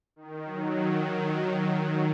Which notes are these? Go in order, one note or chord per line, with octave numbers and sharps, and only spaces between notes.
D#3
F#3
D#3